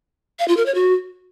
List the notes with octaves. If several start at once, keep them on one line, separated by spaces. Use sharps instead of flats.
F5
F4
A#4
C#5
F#4